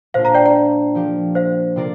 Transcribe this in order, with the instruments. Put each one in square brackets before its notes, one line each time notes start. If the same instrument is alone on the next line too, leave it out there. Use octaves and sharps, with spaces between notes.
[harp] A#2 A#3 D4 F4 [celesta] C5 F5
[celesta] F5 A#5
D5 G5
D5 G5
[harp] F3 A#3 G4
[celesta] C5 F5
[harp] C3 A#3 F4 A#4 D5